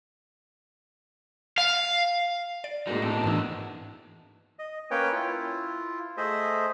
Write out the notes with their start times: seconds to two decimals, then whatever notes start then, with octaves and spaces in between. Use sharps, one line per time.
1.58 F5
2.64 D5
2.87 A2 G#3 A#3 D#4 F#4
3.02 B2 C4 D4 D#4
3.24 G#2 B2 E3 D4 E4
4.59 D#5
4.91 A#3 C#4 B4 C#5 G5
5.12 E4 F4
6.17 A3 G#4 C5 D#5 E5